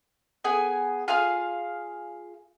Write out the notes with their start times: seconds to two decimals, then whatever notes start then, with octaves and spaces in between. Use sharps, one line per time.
0.44 B3 G#4 G#5
1.08 F4 G#4 F5 F6